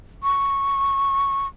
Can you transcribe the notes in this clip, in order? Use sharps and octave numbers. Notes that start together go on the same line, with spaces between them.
C#6